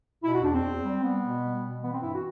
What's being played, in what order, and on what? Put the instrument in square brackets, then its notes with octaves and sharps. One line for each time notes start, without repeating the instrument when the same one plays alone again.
[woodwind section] B2 E4
F#4
E2 D4
C4
E2
G3
G3 B3
B2
G3
B2
E3 B3
C4
G2 E4
F#4